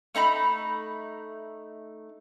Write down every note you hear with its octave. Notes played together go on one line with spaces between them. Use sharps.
A3 D#4 A#5 B5